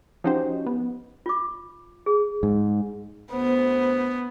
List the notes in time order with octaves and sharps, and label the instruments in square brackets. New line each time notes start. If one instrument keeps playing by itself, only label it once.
[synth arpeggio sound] F3 C#4 D#4 F#4 G4 C5
B3
[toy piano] F4 D6
G#4
[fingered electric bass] G#2
[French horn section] D2 C5 [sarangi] B3